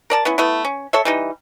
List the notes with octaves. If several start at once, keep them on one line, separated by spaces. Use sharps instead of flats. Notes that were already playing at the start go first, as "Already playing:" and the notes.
A#4 D5 A5
B3 C#4 E4
A3 B3 E4
C#4
A4 C#5 E5
E3 G3 D#4